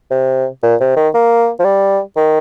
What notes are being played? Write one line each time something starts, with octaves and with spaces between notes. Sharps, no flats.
C3
A#2
C3
D#3
A#3
F3
G3
D#3